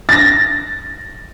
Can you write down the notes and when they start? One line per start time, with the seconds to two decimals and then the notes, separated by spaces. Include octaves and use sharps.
0.09 A6 A#6